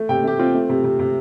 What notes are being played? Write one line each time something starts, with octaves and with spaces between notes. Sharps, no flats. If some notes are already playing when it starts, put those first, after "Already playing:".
Already playing: A3
C3 G5
A3 G4
C4 F4
A3
C3
C3
C3